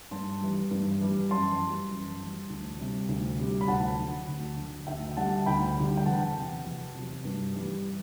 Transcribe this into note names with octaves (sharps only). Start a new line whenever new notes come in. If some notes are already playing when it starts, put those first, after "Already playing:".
G2 A5 C6
E3 G3
G2
E3 G3
F#2 A5 C6
E3 G3
F#2
E3 G3
D2
C3 G3
D2
C3 G3
B5
D2 F#5 A5
D3 F#3
D2
D3 F#3
D2 E5 G5
D3 G3 F#5 A5
D2 G5 B5
D3 G3
G5
E2 F#5 A5
C3 F#3
E2
C3 F#3
G2
E3 G3